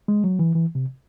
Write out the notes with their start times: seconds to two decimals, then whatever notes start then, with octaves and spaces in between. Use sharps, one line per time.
0.08 G#3
0.24 F#3
0.39 E3
0.55 E3
0.75 C3